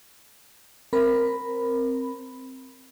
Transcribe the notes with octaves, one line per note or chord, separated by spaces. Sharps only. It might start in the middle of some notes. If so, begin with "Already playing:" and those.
C4 A#4 B5